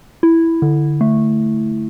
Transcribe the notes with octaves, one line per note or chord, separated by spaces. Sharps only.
E4
D3
A3